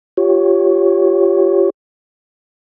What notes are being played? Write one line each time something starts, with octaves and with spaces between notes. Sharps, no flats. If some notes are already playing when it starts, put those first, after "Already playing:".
F4 G4 C#5